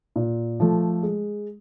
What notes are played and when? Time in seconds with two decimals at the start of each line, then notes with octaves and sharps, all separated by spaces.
0.16 A#2
0.60 F3 A3
1.03 G#3